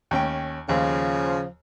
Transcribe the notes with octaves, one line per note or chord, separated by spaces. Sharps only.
D#2 C#4 G5
D#2 C#3 F3